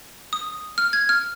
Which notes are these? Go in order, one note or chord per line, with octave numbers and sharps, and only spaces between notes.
D#6
F6
G#6
F6